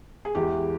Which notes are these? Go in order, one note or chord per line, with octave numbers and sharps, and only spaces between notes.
G#4
E2 E3 G#3 G4